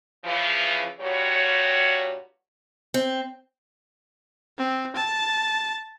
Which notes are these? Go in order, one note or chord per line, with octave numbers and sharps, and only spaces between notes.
C#3 E3 F3
G2 A#2 G3 F#4 C#5
C4
C4
A5